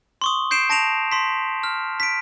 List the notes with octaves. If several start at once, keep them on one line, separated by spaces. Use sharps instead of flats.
C6 C#6 D#6
G6 C7 D7 E7
A5 A#6 D7 E7 F7
C6 B6
F6
B6 D7